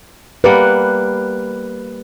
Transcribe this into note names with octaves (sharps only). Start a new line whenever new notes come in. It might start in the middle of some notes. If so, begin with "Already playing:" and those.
G3 A#3 B4 F#5